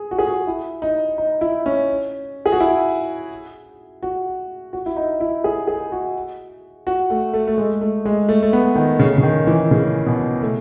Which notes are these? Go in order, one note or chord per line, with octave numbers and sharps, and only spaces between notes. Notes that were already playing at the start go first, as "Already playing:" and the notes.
Already playing: G#4
F#4
G#4
F#4
E4
D#4
D#4
E4
C#4
G#4
F#4
E4
F#4
F#4
E4
D#4
E4
G#4
G#4
F#4
F#4
A3
A3
A3
G#3
A3
G#3
A3
A3
B3
D#3
C#3
C#3
D#3
E3
C#3
B2
A3